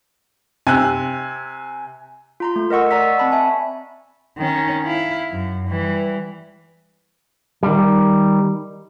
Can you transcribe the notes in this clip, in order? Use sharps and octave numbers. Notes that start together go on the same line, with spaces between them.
C3 G#5 E6 F#6
F4 A#5 C6
A3
A#4 D#5 F#5 C#6 E6
D5 D#5 F#5 A#5 E6 B6
C4 A5 B5 C#6
E5 G#5 A5
D#3 C#4
E4 F5
F#2
E3 G3
D#3 G3